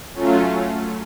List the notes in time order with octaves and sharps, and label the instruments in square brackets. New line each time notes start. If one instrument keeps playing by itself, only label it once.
[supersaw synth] F#3 A3 C#4 F4